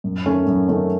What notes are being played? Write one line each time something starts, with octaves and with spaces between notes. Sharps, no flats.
F#2
D#3 A3 C#4
F#2
D#3 A3 C#4